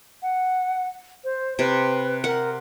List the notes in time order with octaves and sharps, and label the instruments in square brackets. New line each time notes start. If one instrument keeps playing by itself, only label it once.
[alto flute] F#5
C5
[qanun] C3 [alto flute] B4
[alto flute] A#4 [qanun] F#5